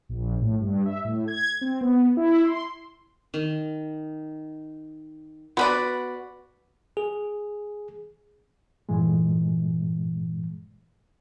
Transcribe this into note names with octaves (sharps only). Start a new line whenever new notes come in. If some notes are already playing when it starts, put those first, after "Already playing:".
A#1
A2
G2
E5
A2
G#6
C4
B3
E4
C6
D#3
B3 F#4 B4 D5 B5
G#4
G2 A#2 E3 G#3